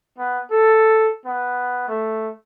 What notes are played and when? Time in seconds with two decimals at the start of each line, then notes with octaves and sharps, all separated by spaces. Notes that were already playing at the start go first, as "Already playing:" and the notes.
0.18 B3
0.51 A4
1.26 B3
1.88 A3